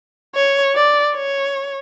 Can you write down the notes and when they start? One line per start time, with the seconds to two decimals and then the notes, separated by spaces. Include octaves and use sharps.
0.35 C#5
0.76 D5
1.15 C#5